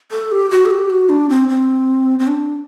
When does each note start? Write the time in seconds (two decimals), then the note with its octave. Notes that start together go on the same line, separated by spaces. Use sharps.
0.11 A4
0.32 G4
0.51 F#4
0.66 A4
0.70 G4
0.90 F#4
1.09 D4
1.30 C4
1.49 C4
2.19 C4
2.27 D4